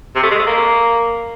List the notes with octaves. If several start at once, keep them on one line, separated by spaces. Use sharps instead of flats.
C3
A3
G#3
A3
A#3